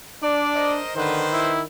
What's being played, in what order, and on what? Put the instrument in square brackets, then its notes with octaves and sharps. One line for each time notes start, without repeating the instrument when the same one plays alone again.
[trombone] D4 [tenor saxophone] D5
[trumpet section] A#4 C5 D#5
[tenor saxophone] D3 [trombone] D#3 [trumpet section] B4 C5
[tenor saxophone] E4